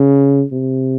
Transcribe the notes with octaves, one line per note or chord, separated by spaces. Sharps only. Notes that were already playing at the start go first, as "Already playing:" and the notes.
Already playing: C#3
C3